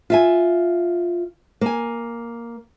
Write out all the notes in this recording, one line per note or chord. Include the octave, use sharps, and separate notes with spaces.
F4 E5 G#5
A#3 G#5